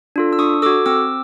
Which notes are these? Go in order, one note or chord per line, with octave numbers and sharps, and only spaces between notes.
D4 F4 A4
E6
D4 C#6 D#6
F#4 A4 D6 E6
C4 D6 E6